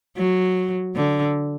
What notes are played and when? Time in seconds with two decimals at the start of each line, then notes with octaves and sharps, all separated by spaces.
0.17 F#3
0.96 D3